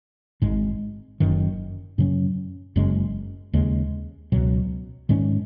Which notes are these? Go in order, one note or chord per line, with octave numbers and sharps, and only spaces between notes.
G#1 G#2 G#3
F#1 F#2 D#3
F#2 C#3 F#3 C#4
F#1 F#2 C#3 G#3
D#2 C#3 G#3
C#2 B2 F#3
G#2 D#3 G#3 C#4